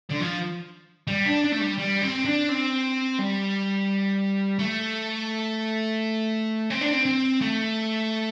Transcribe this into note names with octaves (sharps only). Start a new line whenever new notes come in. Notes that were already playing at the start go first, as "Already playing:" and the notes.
D3
F3
G3
D4
D4
A3
G3
G3
C4
D4
C4
G3
A3
C4
D4
C4
C4
A3